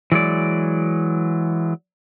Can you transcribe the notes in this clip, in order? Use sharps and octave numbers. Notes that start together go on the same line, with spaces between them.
E3 F#3 G#3 D5